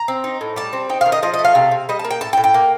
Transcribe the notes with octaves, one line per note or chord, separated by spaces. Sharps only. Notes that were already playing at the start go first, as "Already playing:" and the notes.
Already playing: A#5
C4
D#4
A2
G3 A5
C4
D#4 G5
F5
D#3
D#5
F3 D#5
D#5
A3
F5
C3
C3
G3 D#5
A5
A#3
G5
A2 A5
G5
A2
G5
A#3